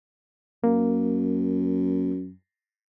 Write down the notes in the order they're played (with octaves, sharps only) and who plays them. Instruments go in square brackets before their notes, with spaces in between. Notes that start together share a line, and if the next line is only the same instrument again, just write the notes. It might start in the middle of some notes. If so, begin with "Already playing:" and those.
[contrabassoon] F#2 [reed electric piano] A#3